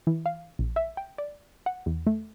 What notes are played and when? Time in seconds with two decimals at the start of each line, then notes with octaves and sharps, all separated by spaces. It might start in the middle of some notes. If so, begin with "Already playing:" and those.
0.07 E3
0.26 F5
0.59 A#1
0.76 E5
0.97 G5
1.18 D5
1.66 F#5
1.86 E2
2.07 A3